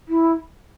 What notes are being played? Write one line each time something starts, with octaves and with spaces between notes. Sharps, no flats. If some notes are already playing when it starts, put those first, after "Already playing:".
E4